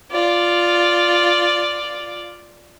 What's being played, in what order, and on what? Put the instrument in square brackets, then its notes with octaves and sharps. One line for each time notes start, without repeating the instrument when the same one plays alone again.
[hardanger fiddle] F4 D5